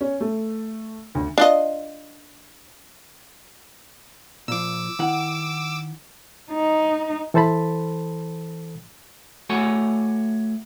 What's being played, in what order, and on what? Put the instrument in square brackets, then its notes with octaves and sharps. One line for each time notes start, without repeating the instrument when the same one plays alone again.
[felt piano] C#4
A3
D2
[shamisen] D4 F4 D#5
[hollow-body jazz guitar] A#2 F3 [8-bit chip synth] D6 E6
[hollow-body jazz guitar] D#3 E4 F#5
[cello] D#4
[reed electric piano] E3 A4 C5 A5 B5
[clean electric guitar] A3 F#4 A4 C#5 F#5 G#5